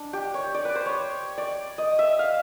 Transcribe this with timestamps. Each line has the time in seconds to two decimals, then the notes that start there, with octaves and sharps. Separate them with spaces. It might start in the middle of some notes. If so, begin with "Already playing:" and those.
Already playing: D4
0.13 G4
0.34 C#5
0.55 D5
0.65 B4
0.75 C5
0.86 C#5
1.38 D5
1.78 D#5
1.99 E5
2.19 F5